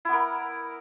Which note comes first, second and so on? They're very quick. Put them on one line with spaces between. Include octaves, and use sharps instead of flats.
E4 B3 A#4